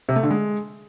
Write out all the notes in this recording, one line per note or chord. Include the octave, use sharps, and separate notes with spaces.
C3
A3
D3
G#3